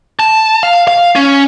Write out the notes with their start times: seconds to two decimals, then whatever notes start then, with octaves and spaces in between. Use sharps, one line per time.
0.20 A5
0.63 F5
0.88 F5
1.16 C#4